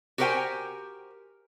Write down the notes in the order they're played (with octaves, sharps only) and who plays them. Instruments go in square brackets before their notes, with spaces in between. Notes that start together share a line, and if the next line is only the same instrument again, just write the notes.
[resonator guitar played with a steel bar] F#4 G4 A#4 C5 G5 G#5